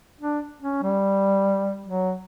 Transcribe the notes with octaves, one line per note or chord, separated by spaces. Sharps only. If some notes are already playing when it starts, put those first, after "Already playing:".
D4
C#4
G3
F#3